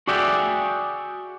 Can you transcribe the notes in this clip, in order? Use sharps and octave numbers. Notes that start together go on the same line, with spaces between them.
F#4 G#4 D5 E5 F#5 G5